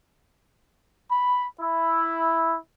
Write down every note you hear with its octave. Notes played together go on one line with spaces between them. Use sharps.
B5
E4